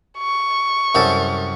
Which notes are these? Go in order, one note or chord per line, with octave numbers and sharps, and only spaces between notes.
C#6
C2 F#2 A4